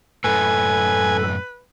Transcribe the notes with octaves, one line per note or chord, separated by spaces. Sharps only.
F#2 A2 A4 B4 G#5